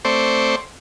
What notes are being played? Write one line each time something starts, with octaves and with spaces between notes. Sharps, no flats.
A3 C4 C5 D5 C#6